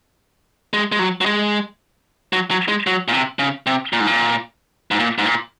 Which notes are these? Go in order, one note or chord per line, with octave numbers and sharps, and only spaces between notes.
G#3
G#3
F#3
F#3
G#3
F#3
F#3
G#3
F#3
A#2
C3
C#3
C3
A#2
G#2
A#2
G#2
A#2
G#2
A#2